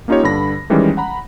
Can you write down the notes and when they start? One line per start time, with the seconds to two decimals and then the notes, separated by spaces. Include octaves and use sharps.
0.08 A#3 C#4 D#4 F4 G4 C#5
0.23 G2 D3 B5 A#6
0.70 D#3 E3 G3 G#3 C#4
0.97 F#5 A#5 B5